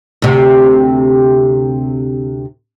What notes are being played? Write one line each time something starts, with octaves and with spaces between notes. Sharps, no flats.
D2 C3